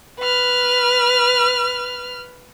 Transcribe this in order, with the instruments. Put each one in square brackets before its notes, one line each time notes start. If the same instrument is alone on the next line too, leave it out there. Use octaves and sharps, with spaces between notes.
[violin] B4 F6